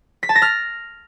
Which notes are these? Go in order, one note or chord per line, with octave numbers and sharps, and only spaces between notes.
B6
A5
A#6
F6